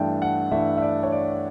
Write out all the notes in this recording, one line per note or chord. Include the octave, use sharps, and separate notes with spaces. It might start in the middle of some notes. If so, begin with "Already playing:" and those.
Already playing: G2 E3 A3 D4 G5
F#5
G2 E3 A3 D4 E5
E5
D5
C#5
D5